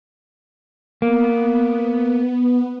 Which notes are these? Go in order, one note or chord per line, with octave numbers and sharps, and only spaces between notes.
A#3 B3